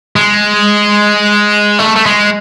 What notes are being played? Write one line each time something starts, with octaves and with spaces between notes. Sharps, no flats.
G#3
A3
A3
G#3